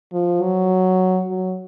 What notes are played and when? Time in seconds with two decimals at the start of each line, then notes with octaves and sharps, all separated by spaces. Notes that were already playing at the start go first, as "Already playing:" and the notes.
0.12 F3
0.41 F#3
1.28 F#3